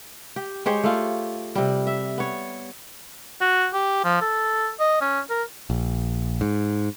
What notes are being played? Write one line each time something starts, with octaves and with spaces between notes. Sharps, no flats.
G4
G#3 G4 C5 C#5
A3 F4
C3 G3
E5
B3 C#5
F#4
G4
F3
A4
D#5
C#4
A#4
A#1
G#2